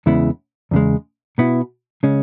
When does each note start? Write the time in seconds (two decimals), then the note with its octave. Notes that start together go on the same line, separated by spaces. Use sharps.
0.06 E2 C#3 G#3 B3 E4
0.71 E2 C#3 G#3
1.38 B2 B3 E4
2.03 C#3 G#3 C#4